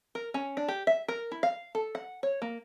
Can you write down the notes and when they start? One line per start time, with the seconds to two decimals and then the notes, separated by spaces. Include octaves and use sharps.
0.15 A#4
0.34 C#4
0.57 D4
0.68 G4
0.87 E5
1.08 A#4
1.32 E4
1.43 F5
1.75 A4
1.95 F#5
2.23 C#5
2.42 A#3